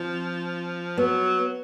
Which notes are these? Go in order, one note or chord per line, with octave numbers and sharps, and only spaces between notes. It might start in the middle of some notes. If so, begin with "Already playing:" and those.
Already playing: F3 C4
F#3 B3